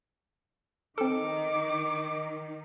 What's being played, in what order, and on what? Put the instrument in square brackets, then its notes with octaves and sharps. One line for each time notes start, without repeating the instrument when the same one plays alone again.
[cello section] D#3 [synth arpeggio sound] C4 A4 [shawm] D6